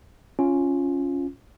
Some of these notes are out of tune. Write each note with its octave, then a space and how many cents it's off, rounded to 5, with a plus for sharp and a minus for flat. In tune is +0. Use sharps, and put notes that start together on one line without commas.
C#4 +0 F4 +0